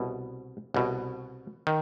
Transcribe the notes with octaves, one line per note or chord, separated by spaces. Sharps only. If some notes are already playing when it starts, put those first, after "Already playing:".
Already playing: C2 B2
C2 B2
D#3